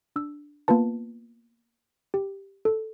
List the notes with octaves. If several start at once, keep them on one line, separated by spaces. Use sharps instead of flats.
D4 E6
A#3 B3 F4 B4 A5
G4
A4